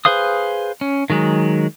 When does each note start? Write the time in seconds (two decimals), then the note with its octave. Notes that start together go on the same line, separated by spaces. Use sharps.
0.05 G#4 B4 C5 F5 D#6
0.81 C#4
1.10 D#3 F#3 G#3